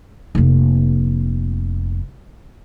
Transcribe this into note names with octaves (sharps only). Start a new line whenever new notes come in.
F1 A#3